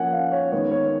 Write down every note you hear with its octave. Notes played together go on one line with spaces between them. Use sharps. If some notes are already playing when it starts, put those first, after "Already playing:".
Already playing: F3 A#3 C#4 F#5 G#5
F5
C#5
D#3 G#3 B3 C#5
C#5